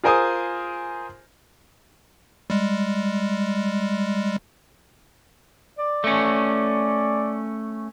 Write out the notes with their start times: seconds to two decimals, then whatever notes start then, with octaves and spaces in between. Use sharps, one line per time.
0.04 F4 G#4 A#4 C5 G#5 D#6
2.50 G3 G#3
5.79 D5
6.04 A3 C#4